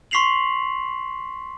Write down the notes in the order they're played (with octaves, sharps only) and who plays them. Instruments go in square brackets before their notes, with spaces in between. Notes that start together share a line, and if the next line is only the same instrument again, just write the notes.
[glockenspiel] C6 C#6 B6 C7 F7 F#7